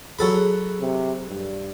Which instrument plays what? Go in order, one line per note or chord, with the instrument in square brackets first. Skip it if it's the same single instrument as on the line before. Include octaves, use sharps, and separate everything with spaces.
[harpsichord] F#3 A4 B5 [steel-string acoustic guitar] G#4 B4 C#5
[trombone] C3
G2